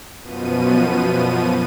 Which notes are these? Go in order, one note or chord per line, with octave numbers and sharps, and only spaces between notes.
F#2 B2 F3 B3 D#7